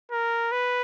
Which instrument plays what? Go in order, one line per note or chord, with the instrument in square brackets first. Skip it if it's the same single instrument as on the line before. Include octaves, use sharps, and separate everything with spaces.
[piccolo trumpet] A#4
B4